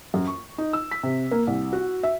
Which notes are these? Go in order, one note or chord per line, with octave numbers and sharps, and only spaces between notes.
F#2
C#6
D#4
E6
B6
C3
A#3
C2
F#4
E5